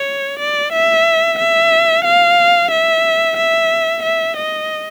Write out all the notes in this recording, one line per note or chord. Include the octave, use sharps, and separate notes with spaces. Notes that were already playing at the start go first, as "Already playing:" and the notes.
Already playing: C#5
D5
E5
E5
F5
E5
E5
E5
D#5